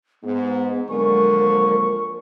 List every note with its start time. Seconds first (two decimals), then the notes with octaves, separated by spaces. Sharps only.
0.23 G#2 B3
0.90 D3 F3 F#3 G#3 A#3 A#4 C#6